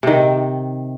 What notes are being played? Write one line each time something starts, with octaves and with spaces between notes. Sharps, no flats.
C3 D#3